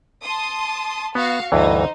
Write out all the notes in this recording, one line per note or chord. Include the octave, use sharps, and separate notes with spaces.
A5 C6 D#6
B3 F#4 F5 C#6
D2 G2 E3 D#4 C5